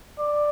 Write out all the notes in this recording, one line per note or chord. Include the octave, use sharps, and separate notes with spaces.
D5